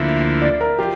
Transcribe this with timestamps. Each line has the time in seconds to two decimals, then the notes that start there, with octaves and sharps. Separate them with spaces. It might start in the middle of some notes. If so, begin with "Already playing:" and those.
Already playing: D2 D3 F3 A#3 E4 E5
0.42 D5
0.61 A#4
0.79 F3 G4